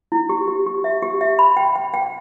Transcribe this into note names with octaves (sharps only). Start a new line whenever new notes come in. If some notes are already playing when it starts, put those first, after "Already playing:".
E4
G4
G4
G4
E5
G4
E5
B5
G5
G5
G5